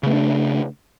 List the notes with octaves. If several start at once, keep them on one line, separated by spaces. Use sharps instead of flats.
C#3 A3 B3 D4